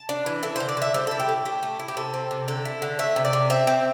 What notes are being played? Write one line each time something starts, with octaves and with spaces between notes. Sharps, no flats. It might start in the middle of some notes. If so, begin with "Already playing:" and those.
Already playing: A5
D4
E3
E4 A4
D3 C5
D5
D3 E5
G3 C5
E4 A4
G4
A2
A3 G4
A3
E4
G4
C3 A4
C4
C3
D3 A4
E4
D3
A3 E5
C3
D5
C3
C4 E5
C4